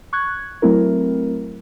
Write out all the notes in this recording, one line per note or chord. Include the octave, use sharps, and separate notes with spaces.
C#6 F#6 G#6
F#3 A3 C4 E4 A#4